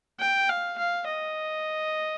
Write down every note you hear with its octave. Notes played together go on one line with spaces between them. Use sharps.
G5
F5
F5
D#5